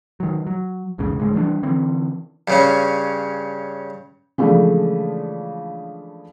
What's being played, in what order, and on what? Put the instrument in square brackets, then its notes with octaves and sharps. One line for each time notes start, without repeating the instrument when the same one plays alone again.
[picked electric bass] D#3 F#3
F#3
B1 E2 G#2 C#3
D1 D2 A2 G#3
E3 G3 A#3 D4
D3 E3 C4
[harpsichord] G2 C#3 C#4
[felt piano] C#3 E3 F3 G#3 A3 D4